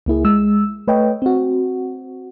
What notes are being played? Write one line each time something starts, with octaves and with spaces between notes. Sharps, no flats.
C#2 A#3 E4 G#4
G#3 E6
A3 B4 C#5 D#5 G5
C4 F#4